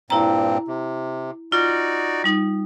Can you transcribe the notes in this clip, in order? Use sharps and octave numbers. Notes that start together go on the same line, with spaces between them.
G2 A#2 C4 E4 A#5
C3
D#4 F4 F#4 D5
G3 D#4